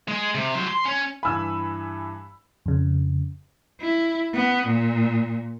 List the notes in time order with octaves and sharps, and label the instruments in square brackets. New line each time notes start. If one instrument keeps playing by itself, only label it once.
[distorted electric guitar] G#3 G#4
C3
F#3 C5
C6
C#4 C#5
[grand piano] G2 E3 G#5 [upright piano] B5 E6
[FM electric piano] F2 C#3
[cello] E4
B3
A#2